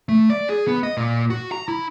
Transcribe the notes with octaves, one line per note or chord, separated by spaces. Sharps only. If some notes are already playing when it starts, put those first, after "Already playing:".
A3
D5
G#4
B3
D#5
A#2
F#4
A#5
E4